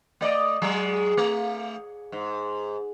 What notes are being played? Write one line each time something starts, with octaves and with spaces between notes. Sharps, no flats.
A3 D5 D#5
F#3 G#3 G#4
A3
G#2